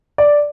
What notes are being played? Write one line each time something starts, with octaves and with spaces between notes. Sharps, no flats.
D5